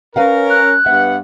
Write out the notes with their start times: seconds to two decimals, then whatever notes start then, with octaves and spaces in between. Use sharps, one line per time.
0.16 C#4 A#4 B4 F5 F#5
0.50 F#6
0.86 G2 B3 E5 F#5